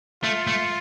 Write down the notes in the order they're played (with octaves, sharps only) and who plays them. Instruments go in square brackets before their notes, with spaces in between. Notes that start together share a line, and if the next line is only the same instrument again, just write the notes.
[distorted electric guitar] A3 [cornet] F4
[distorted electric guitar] A3